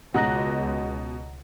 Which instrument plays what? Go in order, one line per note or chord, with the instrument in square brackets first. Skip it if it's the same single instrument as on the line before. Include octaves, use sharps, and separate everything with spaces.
[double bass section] C#2 [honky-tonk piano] B2 D#5 F#6 [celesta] F#5 A#5 A#6